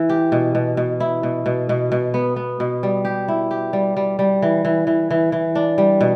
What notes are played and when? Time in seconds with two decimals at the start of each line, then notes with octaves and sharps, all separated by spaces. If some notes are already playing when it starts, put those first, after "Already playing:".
Already playing: E3
0.09 G4
0.32 B2
0.55 B2
0.77 B2
1.00 E4
1.23 B2
1.46 B2
1.69 B2
1.92 B2
2.14 B3
2.36 B3
2.60 B2
2.83 G3
3.05 G4
3.28 E4
3.51 G4
3.73 G3
3.97 G3
4.19 G3
4.42 E3
4.65 E3
4.87 E3
5.11 E3
5.32 E3
5.55 D4
5.78 G3
6.01 B2